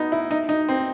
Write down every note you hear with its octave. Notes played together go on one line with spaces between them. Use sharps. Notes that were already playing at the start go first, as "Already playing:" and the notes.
Already playing: B3 D#4
E4
D#4
D#4
C4